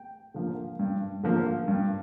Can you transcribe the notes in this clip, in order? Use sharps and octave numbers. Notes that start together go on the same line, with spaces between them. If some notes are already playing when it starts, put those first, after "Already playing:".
Already playing: G5
D3 F3 A#3
G2
D3 F3 A#3
G2